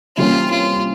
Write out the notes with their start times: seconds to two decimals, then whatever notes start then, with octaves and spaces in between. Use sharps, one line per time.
0.17 C3 E3 G3 A#3 C#4 F4
0.51 F4